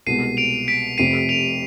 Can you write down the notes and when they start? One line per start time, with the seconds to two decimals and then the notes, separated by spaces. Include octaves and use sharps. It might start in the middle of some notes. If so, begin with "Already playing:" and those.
0.06 C2 B2 G#3 C7 D#7
0.37 D7 F7
0.68 B6 D7
0.98 F1 F2 C3 C7 D#7
1.29 D7 F7